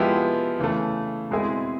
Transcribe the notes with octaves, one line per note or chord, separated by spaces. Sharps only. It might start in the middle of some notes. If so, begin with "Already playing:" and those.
Already playing: F3 G#3 B3 E4 G4
C#3 E3 A3
B2 G#3 C4 E4 G#4